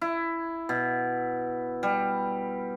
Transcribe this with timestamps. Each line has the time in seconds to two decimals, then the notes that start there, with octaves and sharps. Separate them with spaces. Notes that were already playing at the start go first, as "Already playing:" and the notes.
0.01 E4
0.69 B2
1.83 G3